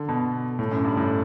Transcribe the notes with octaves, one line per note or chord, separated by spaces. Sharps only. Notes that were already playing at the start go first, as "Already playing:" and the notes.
Already playing: D3
B2
A2
F#2
G2
A2